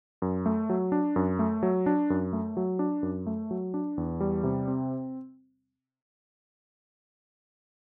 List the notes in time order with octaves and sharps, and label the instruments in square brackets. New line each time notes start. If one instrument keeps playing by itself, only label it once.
[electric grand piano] F#2
A3
F#3
D4
F#2
A3
F#3
D4
F#2
A3
F#3
D4
F#2
A3
F#3
D4
E2
G3
C3
C4